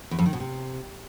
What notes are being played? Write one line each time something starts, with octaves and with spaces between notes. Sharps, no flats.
E2
F2
D#3
B2
C3